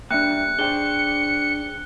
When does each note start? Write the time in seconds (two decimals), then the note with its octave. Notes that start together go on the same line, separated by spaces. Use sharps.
0.11 G3 A#3 D4 E5 G5 F#6 C#7
0.59 D4 G#4 C5 G5 G7